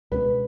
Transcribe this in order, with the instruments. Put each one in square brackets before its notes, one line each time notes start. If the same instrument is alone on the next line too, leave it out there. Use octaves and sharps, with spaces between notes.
[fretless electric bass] C#2 B2 G#3 C#4 [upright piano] B4